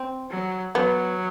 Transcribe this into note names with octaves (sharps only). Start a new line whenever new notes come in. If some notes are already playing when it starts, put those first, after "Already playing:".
Already playing: C4
F#3
F#3 B3